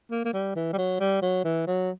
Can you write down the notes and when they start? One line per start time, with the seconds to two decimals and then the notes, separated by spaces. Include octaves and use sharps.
0.11 A#3
0.25 A#3
0.33 G3
0.55 E3
0.73 G3
0.78 F#3
1.00 G3
1.22 F#3
1.44 E3
1.67 F#3